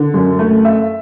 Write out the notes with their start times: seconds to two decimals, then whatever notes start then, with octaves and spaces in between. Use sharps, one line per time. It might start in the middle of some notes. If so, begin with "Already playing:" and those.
Already playing: D3
0.14 F#2
0.39 A3
0.65 E5